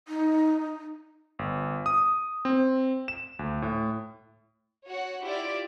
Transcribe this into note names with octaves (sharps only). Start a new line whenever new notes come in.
D#4
G1
D#6
C4
E7
D2
A2
F#4 C#5 F#5
E4 F4 G4 D5